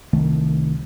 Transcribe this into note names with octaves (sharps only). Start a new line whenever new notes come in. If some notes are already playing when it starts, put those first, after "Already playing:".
C2 D#3 A3